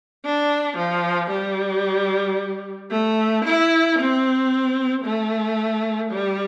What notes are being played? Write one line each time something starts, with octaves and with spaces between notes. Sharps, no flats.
D4
F3
G3
A3
E4
C4
A3
G3